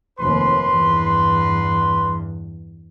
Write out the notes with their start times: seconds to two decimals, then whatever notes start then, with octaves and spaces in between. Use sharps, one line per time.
0.20 F1 D#2 B4 C6
0.67 E2 G2